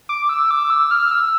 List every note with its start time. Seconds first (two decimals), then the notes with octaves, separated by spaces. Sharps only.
0.09 D6
0.29 E6
0.51 D6
0.70 E6
0.91 F6
1.11 E6